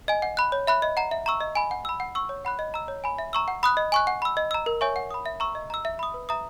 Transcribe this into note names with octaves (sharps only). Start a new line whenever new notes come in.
D#5 G#5
F#5
B5 F#6
C#5
E5 B5 F#6
D#5
F#5 A#5
E5
A#5 C#6 E6
D#5
G#5 B5
F#5
B5 E6
F#5
C#6 E6
C#5
F#5 B5 F#6
D#5
A#5 E6
C#5
G#5 B5
E5
A#5 C#6 E6
F#5
B5 D#6 F#6
D#5
G#5 C#6 F#6
F#5
B5 E6
D#5
A#5 E6
A#4
C#5 E5 G#5 C#6
F#5
B5 D#6
E5
A#5 C#6 E6
D#5
A#5 E6
E5
B5 D#6
B4
E5 A#5 D#6